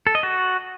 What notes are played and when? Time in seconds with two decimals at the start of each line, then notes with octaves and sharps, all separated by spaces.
0.07 A4
0.15 D#5
0.23 F#4